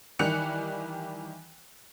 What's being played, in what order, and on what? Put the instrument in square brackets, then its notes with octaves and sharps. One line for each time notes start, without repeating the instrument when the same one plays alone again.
[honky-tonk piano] D#3 E3 G3 F#6 C#7 F7